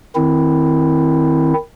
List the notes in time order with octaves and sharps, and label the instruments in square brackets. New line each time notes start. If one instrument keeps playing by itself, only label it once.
[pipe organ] D#3 C4 E4